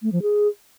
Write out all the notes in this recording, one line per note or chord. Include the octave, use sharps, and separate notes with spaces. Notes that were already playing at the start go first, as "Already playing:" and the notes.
A3
F3
G#4